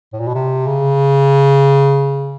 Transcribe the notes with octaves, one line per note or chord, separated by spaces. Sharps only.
A2
A#2
B2
C3
C#3